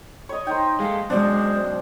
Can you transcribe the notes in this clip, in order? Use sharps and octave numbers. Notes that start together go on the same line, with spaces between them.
C#5 D#5
D#4 C5 G5
G#3 A3 F5
F#2 B2 F#3 G#3 D4 C5